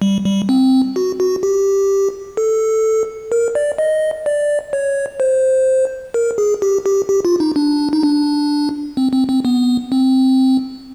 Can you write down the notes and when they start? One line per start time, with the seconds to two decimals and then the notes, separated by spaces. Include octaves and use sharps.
0.02 G3
0.25 G3
0.49 C4
0.96 F#4
1.20 F#4
1.43 G4
2.37 A4
3.32 A#4
3.55 D5
3.78 D#5
4.26 D5
4.73 C#5
5.20 C5
6.14 A#4
6.38 G#4
6.62 G4
6.86 G4
7.09 G4
7.25 F4
7.40 D#4
7.56 D4
7.93 D#4
8.03 D4
8.97 C4
9.13 C4
9.29 C4
9.45 B3
9.92 C4